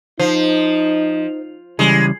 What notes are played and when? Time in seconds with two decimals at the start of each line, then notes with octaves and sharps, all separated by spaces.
0.19 F3 D#4 C5
1.79 C#3 E3 G3 G#3